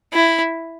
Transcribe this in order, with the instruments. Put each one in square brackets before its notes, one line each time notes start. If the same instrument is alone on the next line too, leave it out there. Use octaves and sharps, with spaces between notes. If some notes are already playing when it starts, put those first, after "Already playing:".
[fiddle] E4